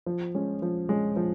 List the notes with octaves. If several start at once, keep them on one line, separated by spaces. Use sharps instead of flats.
F3
G#3 C#4
F3
G#3 C#4
F3